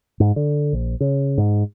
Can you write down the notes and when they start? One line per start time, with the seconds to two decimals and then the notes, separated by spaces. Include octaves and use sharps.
0.20 G#2
0.36 D3
0.73 A#1
1.00 C#3
1.38 G#2